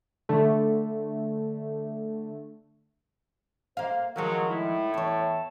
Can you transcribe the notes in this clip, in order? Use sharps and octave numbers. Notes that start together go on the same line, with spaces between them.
D3 A3
A#3 C5 F5
D#3 F3 F#3 G#3 A#4
A2 E4
E2 C#5 A5